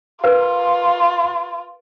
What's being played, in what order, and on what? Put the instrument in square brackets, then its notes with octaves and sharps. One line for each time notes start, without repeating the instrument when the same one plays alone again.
[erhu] F4 [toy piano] A#4 B4 [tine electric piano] F5